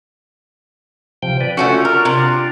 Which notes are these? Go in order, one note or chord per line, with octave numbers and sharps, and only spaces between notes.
C3 F3 G5
B4 D5
A3 C#4 D4 F4 F#4
A#4
C3